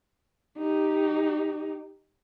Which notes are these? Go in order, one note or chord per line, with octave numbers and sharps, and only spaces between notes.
D#4 G4